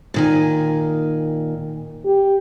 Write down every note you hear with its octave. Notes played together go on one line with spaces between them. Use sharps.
A#2 D#3 G#5
G4